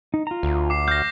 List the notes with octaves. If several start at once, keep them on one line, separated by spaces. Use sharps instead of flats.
D#4
F4 A#5
D2
D6 C7
F#4 F6 G6 A#6